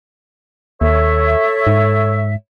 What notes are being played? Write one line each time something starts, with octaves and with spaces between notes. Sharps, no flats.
D#2 A4 C#5 E5
G#2